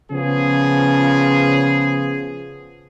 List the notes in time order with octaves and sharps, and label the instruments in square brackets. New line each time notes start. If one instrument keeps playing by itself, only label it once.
[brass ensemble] C#3 F3 B3 G#4